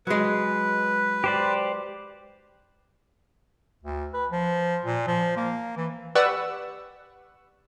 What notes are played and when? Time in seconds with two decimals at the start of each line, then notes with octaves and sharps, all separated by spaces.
0.07 F#3 G#3 B4
1.24 G4 C5 D5
3.83 D2
4.14 B4
4.31 F3
4.84 A#2
5.07 F3
5.37 A#3
5.77 E3
6.15 G4 B4 D5 F#5 C#6 E6